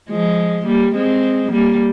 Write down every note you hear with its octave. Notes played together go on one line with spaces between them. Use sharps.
F3 G#3
G3 A#3
G#3 C4
G3 A#3